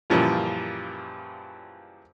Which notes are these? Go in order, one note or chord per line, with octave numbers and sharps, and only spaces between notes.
F#2 A#2 C#3 E3 F3 G3